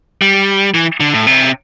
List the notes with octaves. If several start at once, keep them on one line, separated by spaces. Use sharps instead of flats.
G3
E3
D3
A2
C3